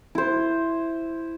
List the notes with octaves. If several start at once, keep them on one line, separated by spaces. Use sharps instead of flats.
E4 C5